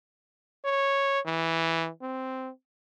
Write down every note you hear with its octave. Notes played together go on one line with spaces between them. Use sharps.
C#5
E3
C4